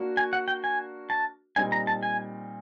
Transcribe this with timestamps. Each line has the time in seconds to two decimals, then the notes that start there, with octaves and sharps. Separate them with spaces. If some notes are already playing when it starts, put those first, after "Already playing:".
Already playing: A#3 D4 F#4
0.17 G#5
0.33 F#5
0.48 G5
0.64 G#5
1.10 A5
1.56 A#2 G3 C4 D#4 G#5
1.72 A#5
1.87 A5
2.03 G#5